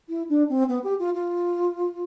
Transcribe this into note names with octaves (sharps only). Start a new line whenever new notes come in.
E4
D4
C4
B3
G4
F4
F4